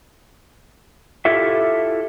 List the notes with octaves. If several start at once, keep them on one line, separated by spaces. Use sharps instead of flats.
E4 F4 G4 A4 E5